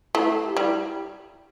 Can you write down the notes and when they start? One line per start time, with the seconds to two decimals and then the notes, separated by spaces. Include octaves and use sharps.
0.14 A3 E4
0.45 G4
0.57 G3 E4